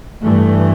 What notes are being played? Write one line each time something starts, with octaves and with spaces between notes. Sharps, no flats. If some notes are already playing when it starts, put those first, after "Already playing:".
G2 E3 A3